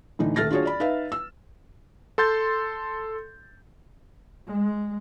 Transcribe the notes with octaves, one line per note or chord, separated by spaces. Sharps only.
A2 D3 E3 D#4
D#1 A3 F6 A6 A#6
D4 F4 F#4 G#4 C#5
D5 B5
D#4 B4 E5 F5
E6
A4 C6 G6 A6
G#3